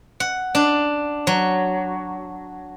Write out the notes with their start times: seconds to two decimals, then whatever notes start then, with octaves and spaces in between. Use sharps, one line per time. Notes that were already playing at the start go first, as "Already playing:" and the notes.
0.20 F#5
0.55 D4
1.27 F#3